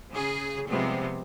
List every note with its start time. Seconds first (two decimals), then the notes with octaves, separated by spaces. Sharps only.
0.12 C#3 G#4
0.67 C3 F3 G3 G#3 B3 C4